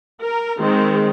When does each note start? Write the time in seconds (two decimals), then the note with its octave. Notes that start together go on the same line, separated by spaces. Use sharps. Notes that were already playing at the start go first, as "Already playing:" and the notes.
0.22 A#4
0.60 D#3 G#3 C4